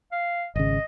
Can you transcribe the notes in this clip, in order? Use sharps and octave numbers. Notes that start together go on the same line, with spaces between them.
F5
G#1 C#3 D#5